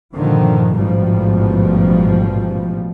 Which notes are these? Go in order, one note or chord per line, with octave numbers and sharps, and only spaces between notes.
G2 A#2 D3 D#3 F3
A1 G#2 B2 F3 G3